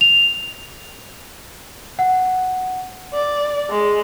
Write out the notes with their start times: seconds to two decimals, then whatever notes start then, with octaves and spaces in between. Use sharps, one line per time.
0.01 F7
1.99 F#5
3.13 D5
3.69 G#3